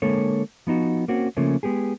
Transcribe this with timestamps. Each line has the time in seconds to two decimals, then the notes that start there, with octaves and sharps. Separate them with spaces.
0.02 D3 G#3 A#3 A4 C#5
0.67 F3 B3 D#4 F#4
1.08 A#3 C4 C#4 F#4
1.37 C#3 F3 A3 A#3 C#4
1.63 G#3 B3 G4 G#4